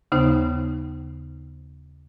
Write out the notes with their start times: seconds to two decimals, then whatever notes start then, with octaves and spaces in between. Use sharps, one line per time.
0.12 D#2 C#3 B3 D#4 C5